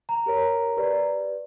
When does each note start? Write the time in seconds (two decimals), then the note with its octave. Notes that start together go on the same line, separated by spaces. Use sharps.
0.09 A#5
0.26 G4 A#4 C#5
0.77 G4 B4 D5